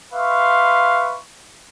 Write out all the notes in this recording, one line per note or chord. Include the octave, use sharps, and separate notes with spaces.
B4 E5 F5 C6 C#6